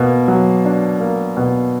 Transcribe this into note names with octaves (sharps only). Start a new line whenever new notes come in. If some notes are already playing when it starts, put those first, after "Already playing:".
Already playing: B2 A#3
F#3
D4
A#3
B2